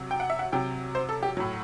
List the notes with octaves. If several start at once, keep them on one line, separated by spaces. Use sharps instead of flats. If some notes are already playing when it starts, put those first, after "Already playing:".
Already playing: C3 F#3
G5
F#5
E5
F#5
C3 F#3 G5
C5
A4
G4
A2 F#3